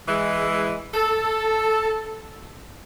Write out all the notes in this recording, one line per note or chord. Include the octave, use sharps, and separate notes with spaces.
E3 G#3
A4